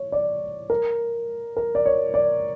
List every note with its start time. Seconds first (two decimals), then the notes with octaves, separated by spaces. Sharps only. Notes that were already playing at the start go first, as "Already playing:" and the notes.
Already playing: C#5
0.12 D5
0.70 A#4
1.57 A#4
1.75 D5
1.85 C#5
2.14 D5